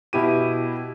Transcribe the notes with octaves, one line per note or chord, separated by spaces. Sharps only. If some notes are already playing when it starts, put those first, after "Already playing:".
B2 E4 G4 D#7